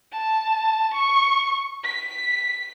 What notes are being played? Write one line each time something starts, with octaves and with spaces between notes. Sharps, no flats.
A5
C#6
B6